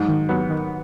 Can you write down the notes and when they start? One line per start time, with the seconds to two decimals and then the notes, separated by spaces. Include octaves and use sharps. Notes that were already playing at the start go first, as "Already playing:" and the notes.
Already playing: G#2 F#3
0.08 D#3
0.29 F#3 B3
0.50 D#3